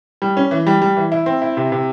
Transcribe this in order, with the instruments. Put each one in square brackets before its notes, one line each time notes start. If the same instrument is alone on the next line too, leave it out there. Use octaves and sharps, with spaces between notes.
[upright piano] G3
C#4
E3
G3
G3
E3
E4
C4
E4
C3
C3